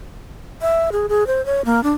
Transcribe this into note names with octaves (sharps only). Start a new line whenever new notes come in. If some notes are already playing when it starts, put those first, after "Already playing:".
E5
G#4
G#4
C5
C#5
A#3
D4